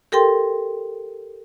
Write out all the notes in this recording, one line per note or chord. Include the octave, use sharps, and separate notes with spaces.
G4 A4 A#4 G5 C6